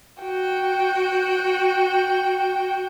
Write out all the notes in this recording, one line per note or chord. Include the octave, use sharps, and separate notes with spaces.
F#4 G5